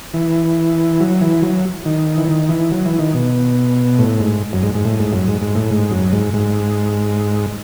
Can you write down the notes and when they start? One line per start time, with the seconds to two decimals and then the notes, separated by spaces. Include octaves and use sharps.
0.14 E3
1.00 F#3
1.21 E3
1.42 F#3
1.85 D#3
2.17 E3
2.29 D#3
2.49 E3
2.71 F#3
2.85 E3
2.99 D#3
3.14 B2
3.99 A2
4.20 G#2
4.53 F#2
4.63 G#2
4.75 G#2
4.85 A2
4.99 G#2
5.13 F#2
5.28 G#2
5.42 G#2
5.55 A2
5.71 G#2
5.91 F#2
6.13 G#2
6.34 G#2